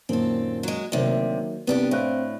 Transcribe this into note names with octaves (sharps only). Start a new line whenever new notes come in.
F#2 A#2 D#3 C4 A4
F#3 G#3
D2 C3 D#3 F#3 A#3
C2 C3 B3 D4 G4
A2 C4 F5 F#6